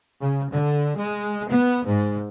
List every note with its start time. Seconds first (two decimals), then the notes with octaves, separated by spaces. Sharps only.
0.21 C#3
0.51 D3
0.97 G#3
1.50 B3
1.86 G#2